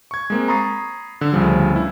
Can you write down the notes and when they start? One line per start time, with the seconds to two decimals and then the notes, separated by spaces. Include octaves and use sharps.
0.11 C#6 G#6
0.30 G#3 A#3 C4
0.48 A#5 B5 C#6 D#6 A6 C7
1.21 D3 E6
1.33 D2 C#3 F3 G3
1.73 G2 E4